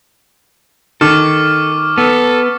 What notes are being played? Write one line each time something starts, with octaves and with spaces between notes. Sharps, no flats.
D#3 A4 C#6 D6 F6
B3 A4